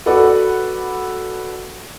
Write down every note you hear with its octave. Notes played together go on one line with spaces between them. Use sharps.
F#4 A4 B4 D5 F#5